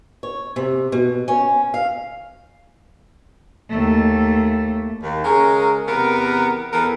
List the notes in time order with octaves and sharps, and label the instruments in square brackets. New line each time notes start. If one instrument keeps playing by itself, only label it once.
[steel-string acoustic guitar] C#5
C3
B2
C#4
F5
[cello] D#2 A3
[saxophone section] D#2
C#3 G#3 C#4 A#4
E2 C3 B3 A#4
E2 E3 B3 A4 A#4